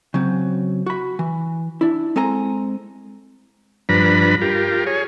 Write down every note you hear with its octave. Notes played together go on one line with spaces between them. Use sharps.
C#3 F#3 C4
F#4 B5
E3
D4 E4
G#3 C4 A4 G#5 A#5
G2 F3 D4 B4 A#5 B5
F4 G4 A#4
G#4 C#5